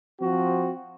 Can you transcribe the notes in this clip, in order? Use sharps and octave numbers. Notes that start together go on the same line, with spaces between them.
F3 C4 F#4